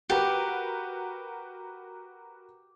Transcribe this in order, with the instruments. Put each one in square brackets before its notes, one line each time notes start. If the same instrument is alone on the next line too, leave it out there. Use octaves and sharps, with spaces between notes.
[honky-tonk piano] F#4 A#4 B4 [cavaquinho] G4